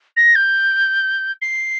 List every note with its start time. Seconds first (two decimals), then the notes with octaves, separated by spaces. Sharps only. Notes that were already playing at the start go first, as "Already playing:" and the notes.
0.16 A#6
0.35 G6
1.41 C7